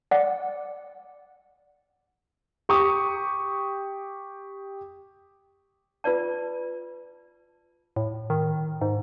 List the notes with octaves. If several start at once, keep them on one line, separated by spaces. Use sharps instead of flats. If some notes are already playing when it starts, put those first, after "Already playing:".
D5 F#5
G4 C#6 D#6
F4 B4 D5 A5
A2
D#3
G#2